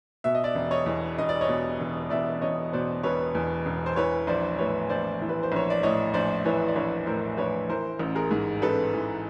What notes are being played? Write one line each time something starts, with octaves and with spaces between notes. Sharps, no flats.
B2 E5
D#5
D5 E5
E1
C#5 D#5
E2
E1 D#5
D5
C#5 D#5
B2
E1
E2 D5 E5
E5
E1 C#5 D#5
B2 C5 D5
E1 B4 C#5
E2
E1
C5
E3 B4 C#5
A#1 C5 D5
A2 B4 C#5
A#1 C5 D5
E3
B4
C5
A#1 C#5
D5
A2 C#5 D#5
A#1 C5 D5
E3 B4 C#5
D5
A#1 B4 C#5
A2 A#4 C5
A#1 B4 C#5
E3 A#4 C5
A1
G#4 A#4
G#2
A1 A4 B4
E3